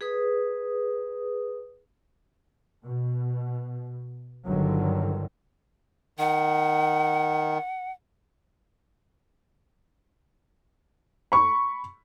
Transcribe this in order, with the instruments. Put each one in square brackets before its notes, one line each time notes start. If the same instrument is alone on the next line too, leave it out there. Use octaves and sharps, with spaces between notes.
[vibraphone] G#4 B4 D#6
[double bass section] B2
G1 D3 D#3 F#3
[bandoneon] D#3 [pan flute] F#5
[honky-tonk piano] B5 C#6